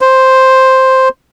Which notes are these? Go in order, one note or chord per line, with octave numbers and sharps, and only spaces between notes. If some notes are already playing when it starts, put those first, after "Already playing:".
C5